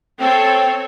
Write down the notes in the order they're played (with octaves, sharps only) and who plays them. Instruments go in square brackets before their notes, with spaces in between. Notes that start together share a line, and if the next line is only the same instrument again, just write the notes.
[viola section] C4 A4 C#5 [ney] G5